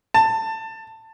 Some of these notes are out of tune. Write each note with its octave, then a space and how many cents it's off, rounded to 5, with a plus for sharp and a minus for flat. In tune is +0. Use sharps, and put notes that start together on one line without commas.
A5 +20